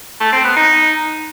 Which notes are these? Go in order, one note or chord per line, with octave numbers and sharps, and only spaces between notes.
A3
C4
B3
D#4